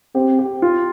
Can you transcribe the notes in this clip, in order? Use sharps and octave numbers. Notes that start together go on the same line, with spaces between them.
C4 G4
G4
F4